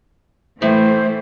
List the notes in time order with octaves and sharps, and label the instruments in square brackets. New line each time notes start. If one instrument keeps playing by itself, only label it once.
[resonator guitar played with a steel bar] A2 [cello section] E3 A3 [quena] C5